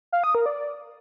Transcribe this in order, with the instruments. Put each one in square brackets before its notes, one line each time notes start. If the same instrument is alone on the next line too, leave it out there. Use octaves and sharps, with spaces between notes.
[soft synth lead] F5
D#6
A#4
D5